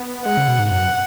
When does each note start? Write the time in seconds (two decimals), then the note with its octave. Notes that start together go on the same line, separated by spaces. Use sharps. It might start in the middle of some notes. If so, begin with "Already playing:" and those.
Already playing: B3
0.26 G#3 F#5
0.37 C#3
0.48 B2
0.59 G#2
0.71 F#2 F#5